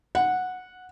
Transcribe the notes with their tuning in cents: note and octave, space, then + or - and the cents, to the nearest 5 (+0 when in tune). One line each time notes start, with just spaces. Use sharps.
F#5 -10